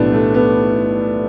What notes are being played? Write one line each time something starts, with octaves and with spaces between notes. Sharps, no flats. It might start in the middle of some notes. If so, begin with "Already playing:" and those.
Already playing: B1 A2 E3 G3 B3 D4
A3
B3